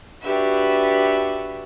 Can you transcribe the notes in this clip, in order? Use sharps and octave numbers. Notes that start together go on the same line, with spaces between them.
D4 F#4 G4 B4 E5